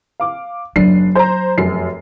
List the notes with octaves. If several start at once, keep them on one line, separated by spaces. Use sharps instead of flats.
F5 D6
F#1 F#3 D4 D#4 C7
C5 A#5
F1 F#2 C7